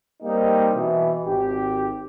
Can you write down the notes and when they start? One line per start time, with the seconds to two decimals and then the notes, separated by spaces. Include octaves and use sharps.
0.22 G3 A#3 C4 D#4 G4
0.75 B2 E3
1.25 G#1 G4